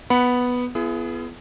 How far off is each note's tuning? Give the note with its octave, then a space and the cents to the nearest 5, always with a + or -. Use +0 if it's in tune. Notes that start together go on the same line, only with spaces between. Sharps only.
B3 +0 F#5 +0 B5 +0
B3 +0 E4 +45 G#4 +25